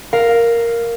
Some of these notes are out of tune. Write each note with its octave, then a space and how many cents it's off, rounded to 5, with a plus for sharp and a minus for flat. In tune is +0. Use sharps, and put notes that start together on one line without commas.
A#4 +0 F5 +0